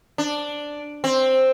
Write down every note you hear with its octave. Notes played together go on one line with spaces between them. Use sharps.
D4
C4